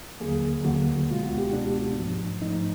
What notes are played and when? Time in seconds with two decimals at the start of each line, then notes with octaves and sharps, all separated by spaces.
0.20 D#2 D3 F#3 A#3 G#4
0.64 D#2 D3 F#3 A#3 F#4
1.09 C#2 B2 G#3 B3 F4
1.23 F#4
1.38 G4
1.53 C#2 B2 G#3 B3 D4
1.97 G#2 F3 A3
2.41 G#2 F3 A3 D#4